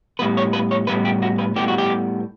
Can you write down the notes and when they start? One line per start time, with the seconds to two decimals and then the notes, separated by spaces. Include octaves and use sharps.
0.19 A2 G3 B3 B4
0.37 C#5
0.53 B4
0.71 C#5
0.87 A2 G3 B3 B4
1.05 G4
1.22 F#4
1.38 B4
1.56 A2 G3 B3 G4
1.68 F#4
1.78 G4